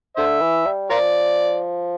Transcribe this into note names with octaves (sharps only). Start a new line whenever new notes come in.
D3 C5 E5
E3
G3
F3 F4 A#4 D5